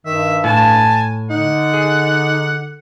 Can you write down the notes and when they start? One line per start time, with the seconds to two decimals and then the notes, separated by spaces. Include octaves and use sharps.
0.05 G2 D#3 E5
0.44 A2 G#5 A5
1.30 D3 D#4 F#5
1.74 G#4